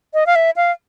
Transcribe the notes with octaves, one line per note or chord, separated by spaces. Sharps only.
D#5
F5
E5
F5